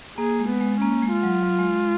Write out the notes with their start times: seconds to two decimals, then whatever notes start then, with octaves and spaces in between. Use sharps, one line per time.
0.18 A#3 G#4
0.40 G#3
0.49 B3
0.61 G#3
0.81 A#3 C#4
1.02 G#3
1.13 F4
1.23 F#3
1.43 F#3
1.59 G#3
1.75 G#3